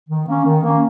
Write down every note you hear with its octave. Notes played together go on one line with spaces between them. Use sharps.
D#3
A#3 C#4
D#3
A#3
C#4